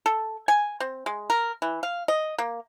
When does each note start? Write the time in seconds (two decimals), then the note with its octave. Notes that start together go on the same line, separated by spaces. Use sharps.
0.06 A4
0.48 G#5
0.80 C4
1.06 G#3
1.30 A#4
1.62 E3
1.83 F5
2.08 D#5
2.38 A#3